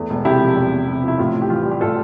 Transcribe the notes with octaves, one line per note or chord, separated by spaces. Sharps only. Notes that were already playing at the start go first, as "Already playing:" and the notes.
Already playing: E2 A3
E1
C3 E4 G4
F3
E2
E1
C3
F3 E4
A2 F4
A1
G4
E3 F4
G3
G4
A2 F4 A4